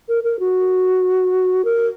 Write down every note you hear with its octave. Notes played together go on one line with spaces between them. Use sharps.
A#4
A#4
F#4
A#4